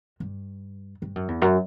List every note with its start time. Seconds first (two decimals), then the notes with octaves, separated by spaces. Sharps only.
0.20 G2
1.02 G2
1.16 F#2
1.28 E2
1.42 F#2